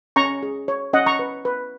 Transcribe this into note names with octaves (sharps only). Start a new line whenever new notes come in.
C#4 A#5 C#6
G#4
C#5
C#4 D#5 F#5
A#5 C#6
B4
B4